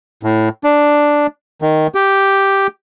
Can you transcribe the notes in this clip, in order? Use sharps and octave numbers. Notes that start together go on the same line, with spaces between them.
A2
D4
D#3
G4